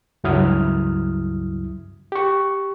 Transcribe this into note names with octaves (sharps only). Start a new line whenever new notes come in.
C#2 G2 F#3 E4 D#6 F6
G4 C#6